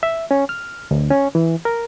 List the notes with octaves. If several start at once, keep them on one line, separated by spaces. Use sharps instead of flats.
E5
C#4
F6
D2
C#4
E3
A#4